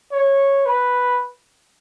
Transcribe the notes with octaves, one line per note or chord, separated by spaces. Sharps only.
C#5
B4